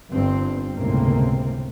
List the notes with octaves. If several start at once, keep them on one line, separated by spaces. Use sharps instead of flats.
G1 G2 C4
G1 C#2 A2 C3 A#3 C4